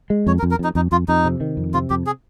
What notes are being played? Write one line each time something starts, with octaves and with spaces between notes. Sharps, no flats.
G#3
F2 C#5
A#4
F2
A#4
F2 D#4
F2 D#4
F2 F4
F2 D#4
C3
D#3
F2
C3 F4
F2 G4
G#4